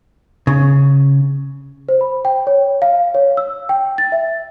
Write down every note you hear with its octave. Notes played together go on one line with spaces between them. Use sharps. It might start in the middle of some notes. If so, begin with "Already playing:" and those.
C#3
C5
B5
G5
C#5
F5
C#5
E6
G5
A6
E5